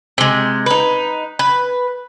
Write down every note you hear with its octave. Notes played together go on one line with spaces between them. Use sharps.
C3 G#3
D#4 B4
B4